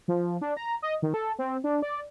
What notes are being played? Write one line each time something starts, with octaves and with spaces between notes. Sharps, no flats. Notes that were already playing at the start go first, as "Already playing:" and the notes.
F3
D4
A#5
D#5
D#3
A4
C4
D4
D5